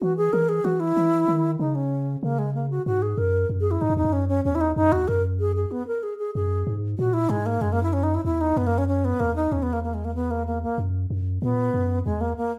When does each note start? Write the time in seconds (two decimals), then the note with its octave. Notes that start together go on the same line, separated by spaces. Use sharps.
0.01 E3 F#4
0.17 G#4
0.33 E3 A#4
0.49 G#4
0.64 E3 F#4
0.80 E4
0.97 E3
1.28 D#3
1.59 C#3 D#4
1.75 C#4
2.23 C#3 A#3
2.39 G#3
2.55 A#3
2.70 F#4
2.86 G#2 F#4
3.02 G#4
3.17 F#2 A#4
3.49 F#2
3.60 G#4
3.71 E4
3.81 G#2 D#4
3.90 F#2
3.97 E2 D#4
4.04 F#2
4.13 C#4
4.29 C#4
4.45 E2 C#4
4.55 E4
4.61 D#4
4.76 F#2 D#4
4.92 E2 F#4
5.08 F#2 A#4
5.40 G#4
5.56 G#4
5.71 B3
5.88 A#4
6.03 G#4
6.19 G#4
6.35 F#2 G#4
6.67 G#2
6.98 A#2 F#4
7.14 E4
7.29 G#2 G#3
7.46 A#3
7.61 F#2 G#3
7.72 A#3
7.83 E4
7.93 C#4
8.03 D#4
8.15 E4
8.25 E2 E4
8.41 D#4
8.56 F#2 B3
8.67 A#3
8.78 C#4
8.88 C#4
9.05 B3
9.20 E2 A#3
9.36 D#4
9.52 E2 C#4
9.63 B3
9.73 A#3
9.84 A#3
9.94 G#3
10.05 A#3
10.15 B3
10.31 A#3
10.47 A#3
10.63 A#3
10.78 F#2
11.10 F#2
11.42 A#2 B3
11.74 F#2
12.05 E2 G#3
12.21 A#3
12.37 A#3